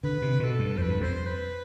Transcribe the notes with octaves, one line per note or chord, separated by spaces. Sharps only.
D3 B4
C3
B2 A4 B4
G2
F2 B4 C5
G2
F2 C5
B4